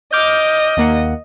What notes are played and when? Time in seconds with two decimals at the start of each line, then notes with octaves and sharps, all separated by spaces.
0.13 D#5 D6 F6 G6
0.77 D#2 A#3 F#5